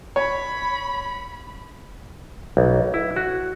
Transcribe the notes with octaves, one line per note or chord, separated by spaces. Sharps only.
C#5 B5
B1
E4
F#4